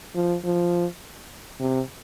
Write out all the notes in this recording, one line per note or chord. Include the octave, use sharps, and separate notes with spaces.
F3
F3
C3